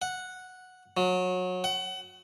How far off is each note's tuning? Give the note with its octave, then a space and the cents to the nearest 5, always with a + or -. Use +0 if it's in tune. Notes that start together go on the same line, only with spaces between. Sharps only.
F#5 -5
F#3 -25
F#5 +30